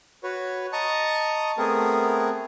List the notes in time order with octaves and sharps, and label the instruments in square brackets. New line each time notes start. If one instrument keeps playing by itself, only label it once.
[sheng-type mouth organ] F#4 B4 C#5
D#5 A5 A#5 C#6 D#6
A3 B3 C4 G#4 A#4